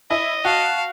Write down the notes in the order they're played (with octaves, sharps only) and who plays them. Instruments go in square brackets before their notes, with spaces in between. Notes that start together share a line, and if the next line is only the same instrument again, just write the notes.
[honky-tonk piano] E4 [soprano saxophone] D#5
[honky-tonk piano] F#4 [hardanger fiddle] F5 [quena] A5